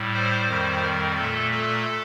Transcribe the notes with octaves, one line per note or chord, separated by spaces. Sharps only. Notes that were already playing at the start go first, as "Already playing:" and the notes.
Already playing: A2 G3
C5
F2 D#3 G3
A#4
A#2 A3 A4
A4